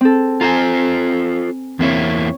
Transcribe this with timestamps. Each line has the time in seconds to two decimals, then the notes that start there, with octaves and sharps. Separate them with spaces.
0.01 C4 A4
0.41 F4 A4 C5 G#5 A#5
1.79 E2 A#3 C4 E4 C#5